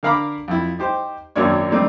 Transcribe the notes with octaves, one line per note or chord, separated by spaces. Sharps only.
D3 A#4 F5 A#5 B5 D6
F2 E4
D#4 G4 C5
G#1 F#2 A#3 D4 C#5
D#3 G3 A3 C4 D4 D#4